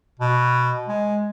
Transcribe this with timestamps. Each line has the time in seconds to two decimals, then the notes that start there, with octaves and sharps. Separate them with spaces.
0.19 B2
0.88 G#3